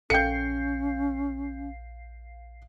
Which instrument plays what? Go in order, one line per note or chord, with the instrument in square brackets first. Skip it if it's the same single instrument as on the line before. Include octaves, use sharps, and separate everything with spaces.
[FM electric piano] A#1 F5 C7 [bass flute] C#4 [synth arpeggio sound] A4 G5 [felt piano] G6 C#7